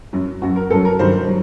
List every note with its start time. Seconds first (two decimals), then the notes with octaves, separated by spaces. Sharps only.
0.13 F#2 F#3
0.42 F#2 F#3 F#4
0.56 A#4
0.70 F#2 F#3 A4
0.85 A#4
0.99 G2 D#3 F#3 C5
1.27 F#3